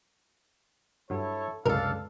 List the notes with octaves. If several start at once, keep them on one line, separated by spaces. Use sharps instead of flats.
G2 F#3 E4 A4 C#5
C2 F#2 C#3 G#3 D4 A4 A#4 F5